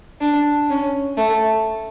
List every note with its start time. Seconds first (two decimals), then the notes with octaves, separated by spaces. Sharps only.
0.21 D4
0.70 C#4
1.17 A3